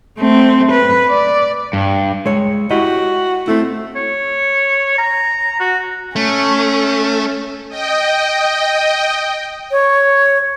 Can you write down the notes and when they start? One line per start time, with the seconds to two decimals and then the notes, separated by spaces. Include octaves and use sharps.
0.19 A3 C4
0.72 B4
1.10 D5
1.73 G2
2.26 G#3 C#5
2.71 E4 F#4 G4 D#5
3.48 A3 C4 E4
3.96 C#5
4.98 A#5
5.60 F#4
6.16 A3 C#4
7.69 D#5 G5
9.71 C#5